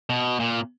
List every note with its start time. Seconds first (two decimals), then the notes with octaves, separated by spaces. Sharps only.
0.10 B2
0.40 A#2